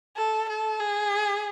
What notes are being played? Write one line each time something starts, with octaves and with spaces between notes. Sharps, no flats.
A4
A4
G#4